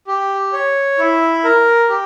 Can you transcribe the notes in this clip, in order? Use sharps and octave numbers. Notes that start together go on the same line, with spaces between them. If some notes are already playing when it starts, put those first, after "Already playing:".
G4
C#5
E4
A#4
G4